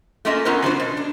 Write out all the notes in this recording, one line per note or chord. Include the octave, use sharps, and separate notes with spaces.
A3 A#3 C#4 F4 D#5 E5
B3 C#4 F4 A4 A#4 C5
C#3 F#3 D4 C5
B2
D4